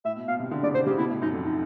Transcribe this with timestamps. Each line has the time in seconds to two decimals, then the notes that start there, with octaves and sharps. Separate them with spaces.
0.05 A2 E5
0.16 B2
0.28 B2 F5
0.40 C3
0.51 D3
0.63 C#3 D5
0.75 C3 C5
0.86 C#3 G4
0.98 B2 E4
1.10 A2
1.22 F#2 D#4
1.33 F2
1.45 D#4